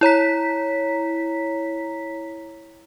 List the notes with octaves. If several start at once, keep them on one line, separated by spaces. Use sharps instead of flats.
E4 C#5 A#5 B6